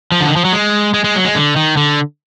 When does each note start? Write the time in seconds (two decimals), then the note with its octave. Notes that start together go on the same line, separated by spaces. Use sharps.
0.12 F3
0.21 D3
0.29 D#3
0.36 F3
0.45 F#3
0.53 G#3
0.94 G#3
1.04 G#3
1.15 F#3
1.25 G#3
1.36 D3
1.56 D#3
1.77 D3